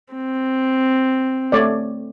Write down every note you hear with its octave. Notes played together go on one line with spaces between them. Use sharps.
C4
A3 C#5 D5